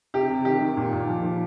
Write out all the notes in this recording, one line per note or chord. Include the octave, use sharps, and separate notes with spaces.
C3 G4
C3
D#3 G4
D#3
A#2
A#2
F3
F3